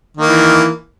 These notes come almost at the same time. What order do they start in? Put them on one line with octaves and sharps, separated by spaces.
D#3 A#3 E3